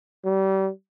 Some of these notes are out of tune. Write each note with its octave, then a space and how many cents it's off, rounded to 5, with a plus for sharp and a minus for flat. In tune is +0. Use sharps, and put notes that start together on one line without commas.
G3 -30